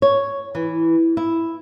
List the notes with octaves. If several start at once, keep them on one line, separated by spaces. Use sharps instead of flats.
C#5
E3
E4